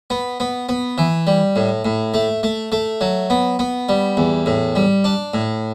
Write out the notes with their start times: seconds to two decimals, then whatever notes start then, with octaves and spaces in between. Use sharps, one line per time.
0.10 B3
0.40 B3
0.69 B3
0.98 E3
1.27 G3
1.56 A2
1.85 A2
2.14 A3
2.43 A3
2.72 A3
3.01 F#3
3.30 B3
3.59 B3
3.89 G3
4.17 E2
4.46 A2
4.76 G3
5.04 D4
5.34 A2